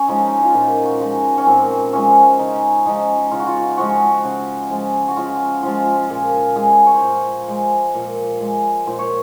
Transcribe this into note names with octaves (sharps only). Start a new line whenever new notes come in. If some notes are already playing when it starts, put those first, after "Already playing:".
Already playing: C#4
F3 G#3 D#4
F4
A#2 D#4
F#4
F3 G#3
C#4
A#2 C4
F3 G#3 C#4
C#3 D#4
F3 G#3 D#4
C#3 F4
F#4
F4
F3 G#3 F#4
C#3
F3 G#3
F#4
C#3 F4
F3 G#3 F4
A#2 G#4
G#3 G#4
C#5
C5
A#2 A#4
G#3
A#2
G#3
A#2 C5
C#5